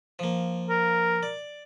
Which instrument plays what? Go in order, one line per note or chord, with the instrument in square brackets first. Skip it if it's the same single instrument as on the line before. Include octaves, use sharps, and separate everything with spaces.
[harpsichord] F3 A#3
[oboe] A#4
[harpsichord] D5